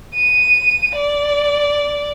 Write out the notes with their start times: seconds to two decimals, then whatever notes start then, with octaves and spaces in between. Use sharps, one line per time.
0.15 D#7
0.96 D5